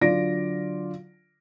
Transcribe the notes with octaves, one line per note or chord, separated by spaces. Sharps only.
D3 F#3 F4 D5 A#6 D7